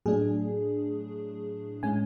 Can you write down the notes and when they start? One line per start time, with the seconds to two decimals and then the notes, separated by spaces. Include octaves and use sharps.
0.06 A2 F#3 A3 D4 G#4
1.83 A2 G#3 C#4 G#5